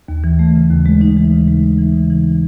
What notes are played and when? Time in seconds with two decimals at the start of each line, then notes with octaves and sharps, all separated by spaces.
0.09 D#2
0.24 E3
0.39 A3
0.55 C#3
0.71 D#2
0.86 G#3
1.01 D#4
1.17 E3
1.32 C#3
1.48 G#3
1.63 D#4
1.79 E3
1.94 C#3
2.10 E3